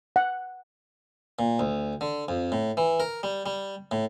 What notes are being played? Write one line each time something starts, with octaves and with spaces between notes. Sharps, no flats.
F#5
A#2
D2
D3
F2
A2
E3
A#4
G3
G3
A2